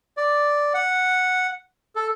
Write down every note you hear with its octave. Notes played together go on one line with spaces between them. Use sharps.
D5
F#5
A4